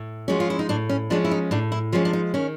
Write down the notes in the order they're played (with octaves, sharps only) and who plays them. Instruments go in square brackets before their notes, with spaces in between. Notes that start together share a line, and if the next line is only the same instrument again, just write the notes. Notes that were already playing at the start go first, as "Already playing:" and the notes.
Already playing: [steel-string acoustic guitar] A2
F3 G#3 C#4 F#4
F4
E4
D#4
A2 D4
C#4
F3 G#3 C#4 D4
E4
D#4
A2 D4
E4
F3 G#3 C#4 F4
D4
D#4
D#3 C#4